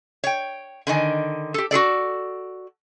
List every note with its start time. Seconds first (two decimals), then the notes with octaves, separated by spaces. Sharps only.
0.24 C#5 G5
0.87 D3 D#3 D#5 G#5
1.54 G4 A4
1.71 F#4 G#4 A4 D5